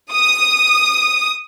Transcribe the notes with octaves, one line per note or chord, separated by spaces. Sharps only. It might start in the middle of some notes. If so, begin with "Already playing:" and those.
D#6